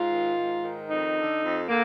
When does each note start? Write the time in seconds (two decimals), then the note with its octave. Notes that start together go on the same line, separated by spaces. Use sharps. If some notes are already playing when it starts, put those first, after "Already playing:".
Already playing: G#2 F4
0.13 D#3
0.38 G#2
0.64 D#3
0.90 F2 D#4
1.17 D3
1.42 F2
1.68 D3 A#3